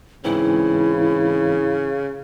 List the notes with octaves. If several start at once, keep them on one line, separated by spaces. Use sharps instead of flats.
G#2 C#3 E3 C4 E4